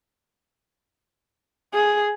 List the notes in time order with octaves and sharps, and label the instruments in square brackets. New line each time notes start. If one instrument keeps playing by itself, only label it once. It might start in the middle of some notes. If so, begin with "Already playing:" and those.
[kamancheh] G#4